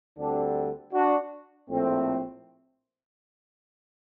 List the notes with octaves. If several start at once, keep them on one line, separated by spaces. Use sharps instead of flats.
D2 D3 G3 C4 D4
D4 F#4
A#1 A2 A3 C4